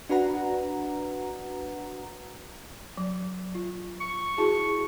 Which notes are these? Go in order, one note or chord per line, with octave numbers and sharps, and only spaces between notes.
D4 F#4 B4 F#5 A#5
F#3
F4
C#6
E4 F#4 G#4 A5